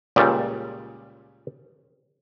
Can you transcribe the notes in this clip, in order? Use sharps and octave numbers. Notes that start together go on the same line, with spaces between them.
C#2 A#2 C#3 G3